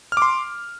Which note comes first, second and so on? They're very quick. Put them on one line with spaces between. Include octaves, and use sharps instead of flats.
F6 D6 C6